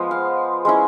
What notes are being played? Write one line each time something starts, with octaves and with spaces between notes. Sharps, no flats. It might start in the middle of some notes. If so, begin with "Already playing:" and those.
Already playing: F3 G#3 B3
F5
G#3 C#4 E4